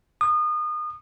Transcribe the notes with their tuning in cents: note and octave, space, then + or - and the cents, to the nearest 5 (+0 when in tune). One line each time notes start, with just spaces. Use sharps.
D#6 -30